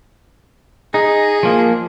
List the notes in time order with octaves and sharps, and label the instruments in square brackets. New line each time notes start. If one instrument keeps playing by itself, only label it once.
[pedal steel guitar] D#4 [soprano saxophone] G#4
[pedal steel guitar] F3 A#3